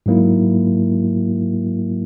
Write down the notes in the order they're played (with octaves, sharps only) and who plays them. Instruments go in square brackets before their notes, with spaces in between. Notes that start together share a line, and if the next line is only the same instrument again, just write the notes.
[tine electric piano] G#2 F#3 A#3 E4